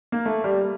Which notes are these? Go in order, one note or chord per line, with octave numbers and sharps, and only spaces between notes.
A#3
A3
G3